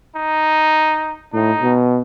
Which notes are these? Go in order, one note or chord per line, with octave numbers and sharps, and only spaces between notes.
D#4
A2 D#4
B2